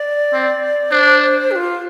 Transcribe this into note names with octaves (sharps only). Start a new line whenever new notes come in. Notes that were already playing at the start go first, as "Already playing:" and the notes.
Already playing: D5
C4
D4 C5
G4
F4